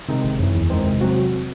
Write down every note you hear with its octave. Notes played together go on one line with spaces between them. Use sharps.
C3 D#3 G#3
G#1
F#2 E3
E2
D#3 G#3 C4
C3
F#3 C4 F#4